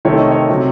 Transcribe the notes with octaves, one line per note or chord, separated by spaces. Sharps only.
C3 D#3 A3 C4 C#5
D#5
C#5
C3 F#3 C4